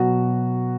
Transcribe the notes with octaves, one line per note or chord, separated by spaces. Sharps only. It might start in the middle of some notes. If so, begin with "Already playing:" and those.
Already playing: B2 F#3 F#4